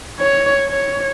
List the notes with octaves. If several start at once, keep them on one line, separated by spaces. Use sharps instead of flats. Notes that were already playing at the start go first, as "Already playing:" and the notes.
C#5
C#5